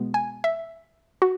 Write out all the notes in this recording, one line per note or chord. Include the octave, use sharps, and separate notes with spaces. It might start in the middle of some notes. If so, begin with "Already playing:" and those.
Already playing: B2 G#3 B3
G#5
E5
F#4